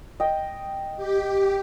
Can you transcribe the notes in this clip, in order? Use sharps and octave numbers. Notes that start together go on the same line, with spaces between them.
D#5 G5
G4